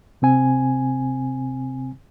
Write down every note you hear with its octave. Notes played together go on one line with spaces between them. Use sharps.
C3 C4 G#5